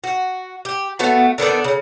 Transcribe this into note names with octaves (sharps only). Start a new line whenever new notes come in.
F#4
G4
A3 B3 F#4
D3 D#3 B3 D4
C#3